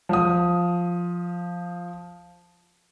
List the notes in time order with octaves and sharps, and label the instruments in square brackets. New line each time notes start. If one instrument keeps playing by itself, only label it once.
[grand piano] F3 D#6